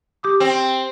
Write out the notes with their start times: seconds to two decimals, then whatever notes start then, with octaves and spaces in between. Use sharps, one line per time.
0.23 G4 D6 D#6
0.40 C4